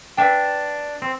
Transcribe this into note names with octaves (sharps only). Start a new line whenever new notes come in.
D4 B4 E5 G5
C4